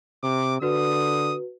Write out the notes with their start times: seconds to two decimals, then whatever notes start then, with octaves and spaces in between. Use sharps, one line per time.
0.23 C3 D6
0.62 D3 F#4 B4 D#6